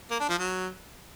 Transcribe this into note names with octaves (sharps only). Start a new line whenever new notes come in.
A#3
D4
F3
F#3